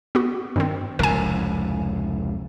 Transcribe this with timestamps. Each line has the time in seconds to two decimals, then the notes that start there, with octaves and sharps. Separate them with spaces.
0.15 B3 F#4
0.56 G2 D#3 C4
0.99 F1 C#2 A2 A#4 G#5